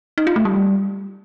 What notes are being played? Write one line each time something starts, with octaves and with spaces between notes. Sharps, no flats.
D#4
F4
A3
G3